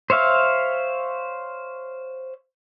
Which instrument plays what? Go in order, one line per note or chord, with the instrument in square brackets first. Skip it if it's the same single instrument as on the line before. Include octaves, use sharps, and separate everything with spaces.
[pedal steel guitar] C5 C#5 E5 F5